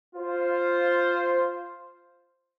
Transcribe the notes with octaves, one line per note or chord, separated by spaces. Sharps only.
F4 C5